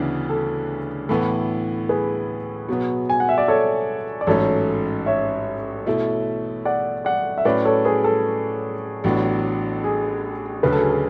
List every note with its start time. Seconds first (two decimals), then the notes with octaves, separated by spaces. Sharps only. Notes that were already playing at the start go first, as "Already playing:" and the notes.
Already playing: D2 C#3 E3 B3 D4
0.29 A4
1.09 A2 E3 B3 A4
1.89 G#4 B4
2.68 B2 F#3 B3
3.10 G#5
3.20 F#5
3.29 E5
3.38 D5
3.48 A4 C#5
4.21 D5
4.27 A1 G#2 F#3 A3 C#4 A4 C#5
5.06 C#5 E5
5.86 B2 A3 E4 A4
6.65 D5 F#5
7.05 D5 F#5
7.38 E5
7.45 A2 F#3 C#4 B4 D5
7.65 A4 C#5
7.85 G#4 B4
8.04 A4
9.04 A1 A2 F#3 B3 D4
9.84 G#4
10.63 D2 C#3 F#3 B4
10.72 A4
10.82 G#4
10.90 A4